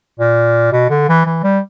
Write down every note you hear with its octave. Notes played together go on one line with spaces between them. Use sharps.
A#2
B2
D3
E3
E3
G3